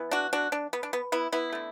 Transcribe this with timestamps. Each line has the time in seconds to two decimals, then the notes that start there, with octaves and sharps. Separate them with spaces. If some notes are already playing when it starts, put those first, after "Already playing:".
Already playing: E3 B3
0.11 D4 F#4
0.33 D4 F#4
0.52 D4
0.73 B3
0.83 D4
0.93 B3
1.12 B3 E4
1.32 B3 E4
1.52 D3 A3